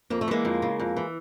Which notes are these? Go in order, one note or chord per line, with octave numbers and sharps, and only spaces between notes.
F2 A#3
A3
E3 G#3 A#3
F2
C#3
F2
E3